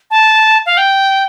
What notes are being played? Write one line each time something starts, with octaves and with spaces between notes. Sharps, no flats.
A5
F5
G5